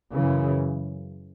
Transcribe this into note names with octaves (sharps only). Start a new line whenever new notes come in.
F#2 C#3 E3